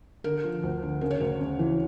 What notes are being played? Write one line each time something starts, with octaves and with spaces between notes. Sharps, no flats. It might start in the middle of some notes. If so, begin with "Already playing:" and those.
D3 A#4
F3
D2
D3
C#3 A#4
C#5
D2 A#4
C#3
E3